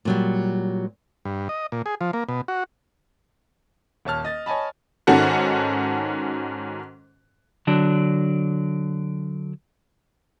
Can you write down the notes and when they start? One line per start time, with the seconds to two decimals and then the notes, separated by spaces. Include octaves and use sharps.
0.05 A#2 F#3 G3
1.25 G2
1.49 D#5
1.72 A#2
1.86 G#4
2.01 F3
2.13 A#3
2.29 B2
2.48 F#4
4.05 D#1 C#5 A5 F6
4.25 D#5 A6
4.46 C#5 D#5 G#5 A5 B5
5.07 G#2 D#3 C#4 F#4 A4 F#5
7.67 D3 F#3 D4